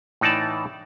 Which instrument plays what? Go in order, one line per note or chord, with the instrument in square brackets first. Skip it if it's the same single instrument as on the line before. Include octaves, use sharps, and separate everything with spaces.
[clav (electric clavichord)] A2 E3 D#4 D5 A5